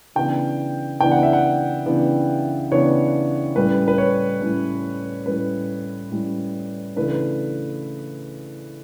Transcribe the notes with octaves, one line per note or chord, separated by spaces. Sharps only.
C#3 E3 B3 D4 G5
C#3 E3 B3 D4 G5
F#5
E5
F#5
C#3 E3 B3 D4
C#3 E3 B3 D4 C#5
A2 G3 C#4 B4
B4
C#5
A2 G3 C#4
A2 G3 C#4 B4
A2 G3 C#4
C#3 E3 A3 D4 B4